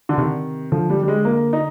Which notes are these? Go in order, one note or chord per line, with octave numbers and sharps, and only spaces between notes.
D3
C3 D#3
D3 F3
G3
G3
G#3
A#3
D#4